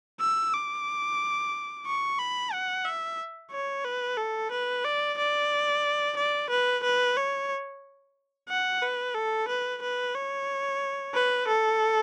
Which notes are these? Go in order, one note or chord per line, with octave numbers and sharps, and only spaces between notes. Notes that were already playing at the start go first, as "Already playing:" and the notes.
E6
D6
C#6
B5
F#5
E5
C#5
B4
A4
B4
D5
D5
D5
B4
B4
C#5
F#5
B4
A4
B4
B4
C#5
B4
A4